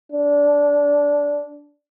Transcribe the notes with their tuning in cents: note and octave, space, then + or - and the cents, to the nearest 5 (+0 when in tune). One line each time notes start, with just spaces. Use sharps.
D4 -15